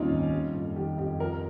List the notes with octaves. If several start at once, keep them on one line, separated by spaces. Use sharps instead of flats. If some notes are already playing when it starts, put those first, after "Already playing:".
Already playing: D#2 D#3 G3 C4 C#4 D#4 F4
D#2
G3
F2
D#3 G4
F2 G4
F3 A#4